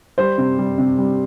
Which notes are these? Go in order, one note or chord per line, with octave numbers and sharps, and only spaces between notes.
G3 C5
C3
G3
C3
G3